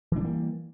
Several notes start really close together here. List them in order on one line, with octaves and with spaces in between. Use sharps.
E3 D4 G3 A#3